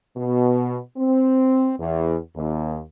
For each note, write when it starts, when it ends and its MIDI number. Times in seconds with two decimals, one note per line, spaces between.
0.16 0.78 47
0.97 1.74 60
1.79 2.16 40
2.36 2.80 39